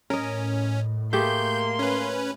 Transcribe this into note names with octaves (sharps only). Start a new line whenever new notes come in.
A2 C#4 A#4 D#5
A3 A#3 G4 G#4 C6 G6
C#4 B4